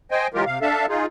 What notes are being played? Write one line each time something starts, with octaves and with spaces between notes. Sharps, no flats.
C5 D#5 G5 G#5
E3 F#3 G#3 F4 G4 A#4
C3 F5
D4 A4 E5 F5 A5
D#4 F4 G#4